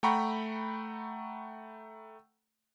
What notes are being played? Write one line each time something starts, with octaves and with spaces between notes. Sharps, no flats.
A3 F#5 G5 A#5 B5 C#6